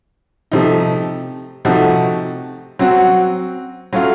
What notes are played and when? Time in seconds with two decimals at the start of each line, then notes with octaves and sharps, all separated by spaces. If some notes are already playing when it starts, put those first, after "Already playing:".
0.52 C3 F3 A3 D#4
1.65 C3 F3 A3 D#4 F#4
2.79 F#3 C4 F#4
3.93 F#3 A3 C#4 F4